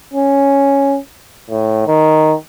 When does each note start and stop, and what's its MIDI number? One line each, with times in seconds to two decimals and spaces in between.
0.14 0.98 61
1.50 1.83 45
1.87 2.34 51